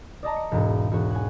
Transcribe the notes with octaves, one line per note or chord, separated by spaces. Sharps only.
D5 D#5 A5 A#5
C#7
E1 G#2
E1 F#4 C#5
F#5 G#5